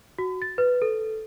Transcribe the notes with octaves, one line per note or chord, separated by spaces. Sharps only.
F#4
A6
B4
A4